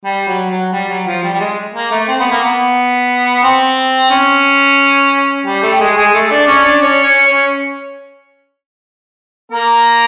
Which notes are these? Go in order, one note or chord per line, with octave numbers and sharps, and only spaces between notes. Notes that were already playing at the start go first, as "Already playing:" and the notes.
G3
F#3
F#3
G3
F#3
F3
G3
G3
G#3
A#3
A3
C4
B3
A#3
B3
C4
C#4
G3 G4
A3 A4
G4
G#3 G#4
G#3 G#4
A3 A4
D4 D5
C#4 C#5
D4 D5
C#4 C#5
C#4 C#5
C#4 C#5
A#3 A#4